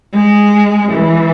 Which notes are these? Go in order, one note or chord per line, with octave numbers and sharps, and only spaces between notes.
G#3
E3